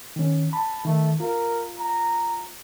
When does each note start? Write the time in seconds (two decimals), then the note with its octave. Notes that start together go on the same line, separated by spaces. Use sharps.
0.16 D#3 C#4
0.53 A5 B5
0.85 D#3 A3
1.20 F4 A#4
1.79 A#5